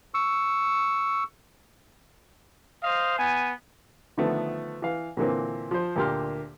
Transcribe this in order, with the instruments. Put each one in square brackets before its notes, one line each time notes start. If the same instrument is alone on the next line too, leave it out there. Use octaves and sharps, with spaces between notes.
[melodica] C#6 E6
[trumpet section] C5 D#5 F5
B3 G#5
[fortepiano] D3 D#3 F3 A3 B3
E3 F5
A#2 D3 E3 A#3 C4
F3 C5
D2 A#2 A#3 G4 C6 F6